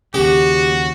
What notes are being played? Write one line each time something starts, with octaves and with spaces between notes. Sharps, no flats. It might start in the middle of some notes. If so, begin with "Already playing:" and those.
D#2 C#3 F#4 G4